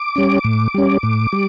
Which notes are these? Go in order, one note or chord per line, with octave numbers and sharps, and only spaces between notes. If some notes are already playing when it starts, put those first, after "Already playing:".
Already playing: D6
G3 C#4
A2
G3 C#4
A2
G3